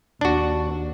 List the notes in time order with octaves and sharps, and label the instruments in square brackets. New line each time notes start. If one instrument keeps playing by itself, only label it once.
[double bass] D#2 [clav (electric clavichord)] D4 F#4